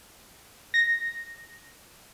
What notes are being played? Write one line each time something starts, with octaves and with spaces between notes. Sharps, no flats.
A#6